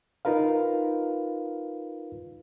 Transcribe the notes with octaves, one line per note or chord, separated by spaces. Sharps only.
D#4 F4 A#4 B4 F5